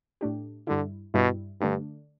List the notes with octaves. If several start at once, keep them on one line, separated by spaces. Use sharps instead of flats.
A2 A3 D4 G4
G2 D3 G3 E4
G2 B2 G3 E4
G2 D3 A3 D4